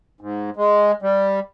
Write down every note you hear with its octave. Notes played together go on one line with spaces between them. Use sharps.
G#2
G#3
G3